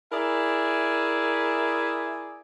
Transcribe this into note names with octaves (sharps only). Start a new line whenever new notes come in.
E4 G#4 A#4 D5 E5 G#5